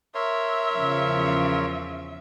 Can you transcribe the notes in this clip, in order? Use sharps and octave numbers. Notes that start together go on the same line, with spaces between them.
A#4 C#5 E5 C6
E2 C#3 F3